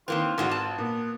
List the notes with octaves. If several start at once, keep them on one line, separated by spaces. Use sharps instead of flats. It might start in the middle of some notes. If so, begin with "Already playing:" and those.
D#3 E3 A#3 C4 F4 B4
G#1 D3 G#3 F#4
A5
A#2 B3